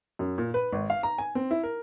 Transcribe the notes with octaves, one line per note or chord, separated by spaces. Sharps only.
F#2
A#2
B4
G#1
F5
A#5
G#5
C4
E4
A#4